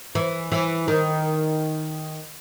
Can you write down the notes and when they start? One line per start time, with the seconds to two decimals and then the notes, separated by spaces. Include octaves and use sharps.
0.15 E3
0.52 E3
0.88 D#3